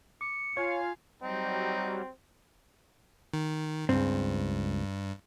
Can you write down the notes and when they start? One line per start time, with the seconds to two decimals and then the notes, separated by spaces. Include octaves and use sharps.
0.21 D6 C#7
0.57 F4 C#5 F5 G#5
1.22 F#3 G3 C4 D#4
3.34 D#3
3.89 C#2 G2 C4